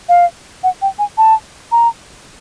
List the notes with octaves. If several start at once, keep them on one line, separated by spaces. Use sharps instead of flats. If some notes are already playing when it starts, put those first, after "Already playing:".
F5
F#5
G5
G#5
A5
A#5